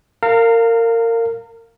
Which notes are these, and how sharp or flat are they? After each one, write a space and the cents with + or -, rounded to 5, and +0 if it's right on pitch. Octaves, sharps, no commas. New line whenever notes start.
A#4 -25 F5 +0 A#5 -40